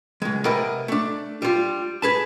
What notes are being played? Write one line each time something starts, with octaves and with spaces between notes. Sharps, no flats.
C#2 G#3
C3 A#4 B4 D#5 F#5
A3 D4
G3 F4
G#4 B4 A5